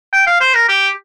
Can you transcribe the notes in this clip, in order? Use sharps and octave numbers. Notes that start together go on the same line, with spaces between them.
G5
F5
C5
A#4
G4